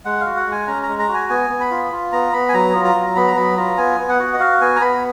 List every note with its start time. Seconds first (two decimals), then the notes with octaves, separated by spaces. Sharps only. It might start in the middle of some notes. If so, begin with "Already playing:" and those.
0.05 G#3 F#5
0.21 F5
0.26 F#4
0.37 F#5
0.47 G#3
0.52 G#5
0.67 C#4 A#5
0.83 A#5
0.88 G#3
0.99 A#5
1.09 F#4
1.14 G#5
1.29 B3 G#5
1.50 B3
1.61 B5
1.71 F4
1.92 F4
2.12 B3 A#5
2.33 B3 B5
2.49 G#5
2.53 F#3 A#5
2.75 F4
2.85 A#5
2.95 F#3
3.16 B3 B5
3.28 A#5
3.36 F#3 B5
3.57 F4 A#5
3.77 B3 G#5
3.99 B3
4.09 F#5
4.19 F#4
4.34 D#5
4.40 F#4 F5
4.61 B3 G#5
4.76 A#5
4.81 B3 B5